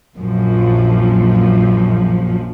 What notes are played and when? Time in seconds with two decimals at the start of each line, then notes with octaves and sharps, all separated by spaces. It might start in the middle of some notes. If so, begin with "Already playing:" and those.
0.15 A#1 F#2 F3